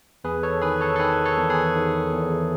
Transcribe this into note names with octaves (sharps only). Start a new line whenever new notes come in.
E2 G#4 B4
A4 C#5
D#3 G#4 B4
A4 C#5
A4
D#3 G#4 B4
A4 C#5
E2
G#4 B4
D#3
E2